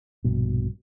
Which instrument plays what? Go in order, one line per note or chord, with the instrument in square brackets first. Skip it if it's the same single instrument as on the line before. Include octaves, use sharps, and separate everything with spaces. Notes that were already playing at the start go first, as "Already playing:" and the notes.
[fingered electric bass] A#1 G2 B2